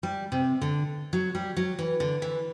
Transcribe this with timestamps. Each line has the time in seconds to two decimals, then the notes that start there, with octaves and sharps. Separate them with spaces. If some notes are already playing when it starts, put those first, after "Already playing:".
0.03 G3
0.32 C3
0.61 D3
1.13 F#3
1.35 G3
1.57 F#3
1.79 E3
2.00 D3
2.22 E3